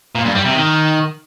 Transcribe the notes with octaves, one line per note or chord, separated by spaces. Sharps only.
A#2
G2
G3
C3
D#3